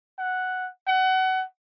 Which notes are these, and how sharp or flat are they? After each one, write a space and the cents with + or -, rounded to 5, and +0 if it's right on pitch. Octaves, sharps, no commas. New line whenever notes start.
F#5 +0
F#5 +25